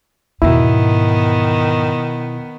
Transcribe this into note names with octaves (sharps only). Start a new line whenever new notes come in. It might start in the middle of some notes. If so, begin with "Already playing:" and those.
E2 G#2 B2 D#3 B3 E4